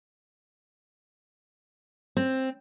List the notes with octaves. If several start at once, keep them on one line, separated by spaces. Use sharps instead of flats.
C4